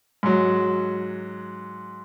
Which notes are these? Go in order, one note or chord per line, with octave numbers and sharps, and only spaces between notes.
G#2 F#3